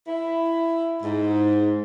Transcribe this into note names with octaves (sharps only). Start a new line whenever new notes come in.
E4
G#2